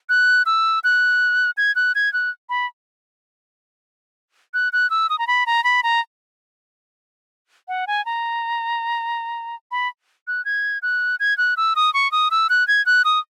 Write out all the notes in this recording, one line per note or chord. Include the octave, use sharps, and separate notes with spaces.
F#6
E6
F#6
G#6
F#6
G#6
F#6
B5
F#6
F#6
E6
D#6
A#5
B5
A#5
B5
A#5
F#5
G#5
A#5
B5
F#6
G#6
F#6
G#6
F#6
E6
D#6
C#6
D#6
E6
F#6
G#6
F#6
D#6